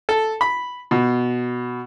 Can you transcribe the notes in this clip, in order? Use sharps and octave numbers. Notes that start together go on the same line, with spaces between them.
A4
B5
B2